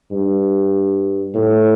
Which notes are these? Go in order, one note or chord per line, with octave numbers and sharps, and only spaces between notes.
G2
A2